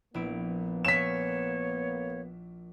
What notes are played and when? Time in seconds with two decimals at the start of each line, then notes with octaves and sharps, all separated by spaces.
0.14 A#1 A#3 B3 E4 D7
0.85 C#5 F5 G#5 C#6 B6 E7